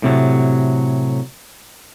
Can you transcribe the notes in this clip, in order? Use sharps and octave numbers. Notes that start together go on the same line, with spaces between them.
A2 C3 F#3